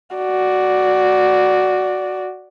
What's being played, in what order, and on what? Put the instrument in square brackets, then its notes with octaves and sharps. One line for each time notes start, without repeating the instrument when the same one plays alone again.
[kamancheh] F#4 D5